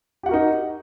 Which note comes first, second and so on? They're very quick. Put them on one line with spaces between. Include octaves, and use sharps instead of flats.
G4 F#5 F#4 A#4 D#4